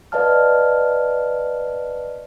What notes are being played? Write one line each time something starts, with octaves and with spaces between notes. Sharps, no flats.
B4 D5 D#5 F5 A5 F6